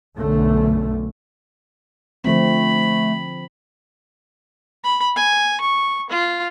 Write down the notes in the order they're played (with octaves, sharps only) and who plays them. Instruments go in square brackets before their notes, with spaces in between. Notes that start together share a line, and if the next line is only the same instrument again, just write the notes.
[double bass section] B1 F#2 D3 A3
[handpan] D3 F3 C4 [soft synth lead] A3 [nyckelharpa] B5
[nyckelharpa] B5
G#5
C#6
F4